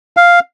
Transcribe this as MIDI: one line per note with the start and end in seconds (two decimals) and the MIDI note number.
0.17 0.39 77